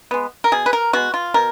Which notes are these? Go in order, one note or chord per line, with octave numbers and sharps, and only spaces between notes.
G#3 B3
A#4
B2 G#4
B4
A#4
G#3 B3 F#4
F4
B2 A#4